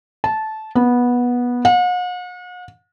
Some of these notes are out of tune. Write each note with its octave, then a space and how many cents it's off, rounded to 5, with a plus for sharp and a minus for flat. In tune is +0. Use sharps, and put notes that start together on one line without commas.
A5 -15
B3 -15
F#5 -45